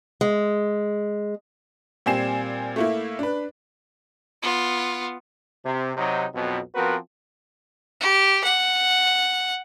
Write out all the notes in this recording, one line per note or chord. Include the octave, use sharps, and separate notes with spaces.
G#3
A#2 G3 C4 G#5 C7 E7
A3 A#3 E4
D4 B4
B3 F4
C3
C3 F#3 D#4
B1 F2 B2
F3 B3 C4 F#4 A#4 B4
G4
F#5